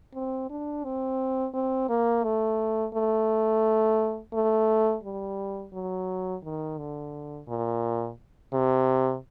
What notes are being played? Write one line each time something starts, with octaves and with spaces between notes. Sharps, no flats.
C4
D4
C4
C4
A#3
A3
A3
A3
G3
F#3
D#3
D3
A#2
C3